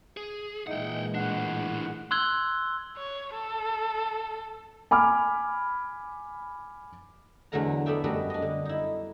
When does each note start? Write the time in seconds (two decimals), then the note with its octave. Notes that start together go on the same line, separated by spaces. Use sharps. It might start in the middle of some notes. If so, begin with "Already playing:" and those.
0.17 G#4
0.67 A#2 E3 G#3 D#4 E4 F#5 G5
1.15 A2 D4 F#5
2.11 C6 E6 F#6 G#6 G7
2.97 C#5
3.34 A4
4.91 G#5 B5 D6 F6
7.52 E2 D3 F#3 A3 A#4 A#5
7.86 A3 B3 D5 E5 G5
8.04 F#2 G3 A3 F#4 D5 D#5
8.30 D4 D#5
8.42 D3
8.65 D#4 E4